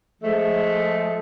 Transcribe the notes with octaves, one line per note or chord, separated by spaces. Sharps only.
F3 G#3 A3